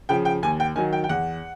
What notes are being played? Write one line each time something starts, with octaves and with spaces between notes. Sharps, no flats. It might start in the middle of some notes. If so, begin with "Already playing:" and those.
C#3 F3 G5
G5
D#2 G#5
G5
D#3 F#3 G#5
G5
G5
E2 F#5